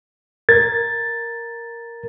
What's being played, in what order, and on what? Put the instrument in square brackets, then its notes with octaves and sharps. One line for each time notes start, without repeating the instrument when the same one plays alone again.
[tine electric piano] A#4 G#6 A6